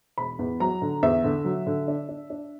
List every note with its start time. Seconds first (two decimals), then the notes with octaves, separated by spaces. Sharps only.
0.18 E1 B5
0.39 E2
0.60 F#3 A#5
0.82 D3
1.03 E2 E5
1.24 D3
1.45 F#3
1.67 D3
1.88 D4
2.09 D4
2.30 D4